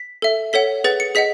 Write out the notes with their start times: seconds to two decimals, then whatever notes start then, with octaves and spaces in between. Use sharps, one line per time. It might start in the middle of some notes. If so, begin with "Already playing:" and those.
Already playing: B6
0.22 A4 E5
0.53 A4 C#5 F#5 B6
0.84 G#4 B4 F#5 A6
1.00 C#7
1.15 G#4 D#5 F#5 B6